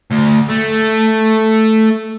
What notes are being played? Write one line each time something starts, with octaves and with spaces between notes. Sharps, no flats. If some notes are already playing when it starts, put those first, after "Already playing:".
D2
A3